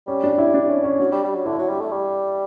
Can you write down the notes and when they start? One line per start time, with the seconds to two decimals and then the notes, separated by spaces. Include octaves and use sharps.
0.07 G3 C#4
0.24 D4
0.38 E4
0.54 D4
0.69 C#4
0.84 C#4
0.99 F#3 D4
1.12 G3
1.23 G3
1.35 F#3
1.46 D3 E4
1.58 F#3
1.69 G3
1.80 A3
1.92 G3